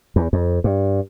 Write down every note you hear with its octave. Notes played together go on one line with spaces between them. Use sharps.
E2
F2
G2